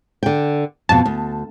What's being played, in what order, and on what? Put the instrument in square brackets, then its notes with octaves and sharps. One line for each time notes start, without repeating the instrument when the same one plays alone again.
[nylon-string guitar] D3 G5
[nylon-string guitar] F2 B2 [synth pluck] A5
[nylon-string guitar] D2